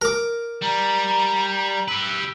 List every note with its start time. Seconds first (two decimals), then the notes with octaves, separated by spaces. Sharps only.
0.02 A#4 D6
0.62 G3 A#5
1.88 G4 B4 E6